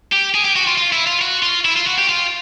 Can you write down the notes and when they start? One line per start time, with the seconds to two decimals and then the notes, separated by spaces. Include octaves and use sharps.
0.12 G4
0.35 G#4
0.45 G4
0.56 F#4
0.67 F4
0.78 F4
0.92 E4
1.07 F4
1.21 F#4
1.43 F4
1.65 E4
1.76 F4
1.86 F#4
1.98 G4
2.09 F4